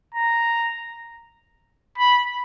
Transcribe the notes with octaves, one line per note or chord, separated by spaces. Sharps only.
A#5
B5